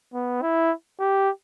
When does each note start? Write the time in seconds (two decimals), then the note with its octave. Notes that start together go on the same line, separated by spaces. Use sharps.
0.14 B3
0.42 E4
1.00 G4